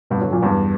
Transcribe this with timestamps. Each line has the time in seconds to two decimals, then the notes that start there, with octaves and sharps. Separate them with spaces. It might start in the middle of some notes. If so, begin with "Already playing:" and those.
0.10 G2 B2
0.21 D3 F#3
0.32 F#2 A#2
0.42 E2 G2